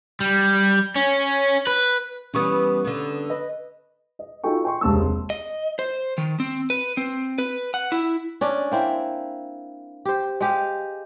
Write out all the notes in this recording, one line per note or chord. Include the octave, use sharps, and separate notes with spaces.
G3
C#4
B4
E3 G3 B3 C#4 C#6 D#6
D3 B3
B4 D#5
D#5
D#4 F4 F#4 A4 G5 C#6
G5 C6 C#6
E1 C#2 C3 A#3 A5 E6
C6
D#5
C5
D#3
C4
B4
C4
B4
F#5
E4
C#4 D4 D5
A#3 C4 E4
G4 C5
G#3 G4 F5